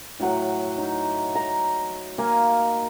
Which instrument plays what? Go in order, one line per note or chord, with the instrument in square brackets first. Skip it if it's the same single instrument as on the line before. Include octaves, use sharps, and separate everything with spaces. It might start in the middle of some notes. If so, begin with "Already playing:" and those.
[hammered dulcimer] A2 F#3 F#5
D#4
A#5
A#3 F5 G#5